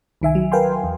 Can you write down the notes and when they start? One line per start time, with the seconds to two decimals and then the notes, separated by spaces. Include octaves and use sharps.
0.21 C2 D#3 E5 G#5
0.35 F#3
0.52 A#4 B4 F5 G5 G#5 C6
0.84 E2